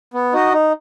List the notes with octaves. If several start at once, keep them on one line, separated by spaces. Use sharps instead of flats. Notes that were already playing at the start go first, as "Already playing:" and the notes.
B3
D#4 F#4 D#5
D#4